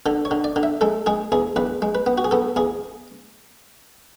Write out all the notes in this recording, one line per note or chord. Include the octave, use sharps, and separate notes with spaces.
D3 A4
C#5
D3
D5
D3
E5
G#3 A4
G#3 G#4
E2 G#4
E2 B4
G#3
B4
B3
F#4
G#4
B3 A4
E2 G#4